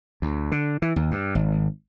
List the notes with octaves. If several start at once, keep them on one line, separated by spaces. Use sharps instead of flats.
D2
D3
E3
D#2
G2
G#1